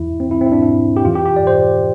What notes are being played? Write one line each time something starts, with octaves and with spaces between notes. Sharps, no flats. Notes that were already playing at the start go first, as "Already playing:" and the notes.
Already playing: E2 E3 E4
C4
E4
C4
E4
D4
E4
G4
F2 E3 F4
G4
G4
D5
C5